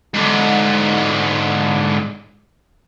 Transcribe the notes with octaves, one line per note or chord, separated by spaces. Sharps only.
G#2 D3